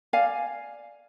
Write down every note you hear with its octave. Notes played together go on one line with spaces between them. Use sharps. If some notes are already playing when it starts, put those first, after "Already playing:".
D5 F5 G#5